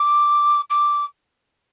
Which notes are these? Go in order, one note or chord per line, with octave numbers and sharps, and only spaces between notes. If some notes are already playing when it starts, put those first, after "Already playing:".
Already playing: D6
D6